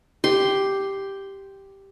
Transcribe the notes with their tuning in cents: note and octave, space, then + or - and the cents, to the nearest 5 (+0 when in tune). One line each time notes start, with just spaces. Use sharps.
G4 +0 C6 +0